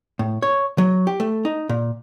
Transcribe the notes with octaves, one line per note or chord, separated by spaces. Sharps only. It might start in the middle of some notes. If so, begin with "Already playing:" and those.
A2
C#5
F#3
G4
A3
D#4
A#2